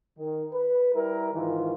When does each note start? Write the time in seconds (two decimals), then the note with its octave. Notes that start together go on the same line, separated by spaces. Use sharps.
0.18 D#3
0.53 B4
0.95 G3 E4 A#4
1.34 G#2 D#3 E3 E4 F4